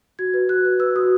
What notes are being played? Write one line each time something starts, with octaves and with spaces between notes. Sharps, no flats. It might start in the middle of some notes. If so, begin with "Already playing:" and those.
F#4 G#6
B4
F#4 F#6
B4
B4 E6
F#4 D#6